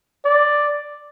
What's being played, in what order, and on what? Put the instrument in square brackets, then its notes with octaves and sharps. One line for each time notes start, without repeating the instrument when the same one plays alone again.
[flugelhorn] D5